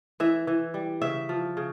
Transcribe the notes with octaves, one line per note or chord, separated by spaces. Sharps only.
E3 E5
E3
G3
C#3 E5
F3
C#3